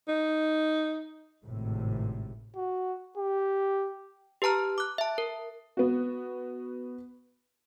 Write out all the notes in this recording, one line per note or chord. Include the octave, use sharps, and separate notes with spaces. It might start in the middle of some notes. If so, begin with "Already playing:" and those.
D#4
G#1 A2 C3
F#4
G4
G4 B4 A5 A#5 F6
D6 F#6
E5 A5
A#4
B3 F#4